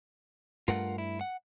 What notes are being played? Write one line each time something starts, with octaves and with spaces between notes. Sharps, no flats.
G2 A3 F4 A#4 F#5
E4
F#5